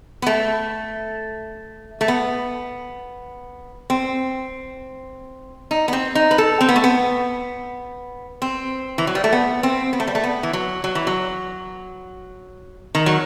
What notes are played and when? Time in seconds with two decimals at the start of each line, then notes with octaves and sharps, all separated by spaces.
0.22 B3
0.26 A3
2.01 A3
2.08 B3
3.90 C4
5.71 D#4
5.88 B3
5.93 C4
6.15 D#4
6.31 B4
6.38 A4
6.61 C4
6.69 B3
6.76 A3
6.84 B3
8.42 C4
8.98 E3
9.07 F#3
9.15 G3
9.24 A3
9.32 B3
9.63 C4
9.93 B3
10.00 A3
10.07 G3
10.15 A3
10.24 B3
10.43 E3
10.53 F#3
10.84 F#3
10.95 E3
11.07 F#3
12.95 D#3
13.06 F#3